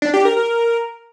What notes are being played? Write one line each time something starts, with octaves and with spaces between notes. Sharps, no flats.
D4
G4
A#4
A#4